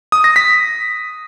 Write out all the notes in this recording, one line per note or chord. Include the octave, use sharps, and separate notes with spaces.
D#6
A#6
B6